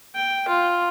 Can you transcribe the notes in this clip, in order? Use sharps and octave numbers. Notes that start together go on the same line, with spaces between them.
G5
F4